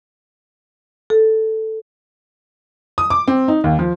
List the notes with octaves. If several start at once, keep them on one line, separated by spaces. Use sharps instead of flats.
A4
D#6
D6
C4
D#4
D#2
F3